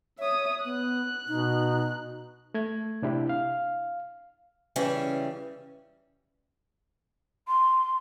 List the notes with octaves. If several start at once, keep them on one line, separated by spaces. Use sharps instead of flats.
C#5 E5 D#6
B3 F#6
B2 D#4
A3 G#6
C3 D4 E4 G4
F5
C#3 E3 G3 C#4
C6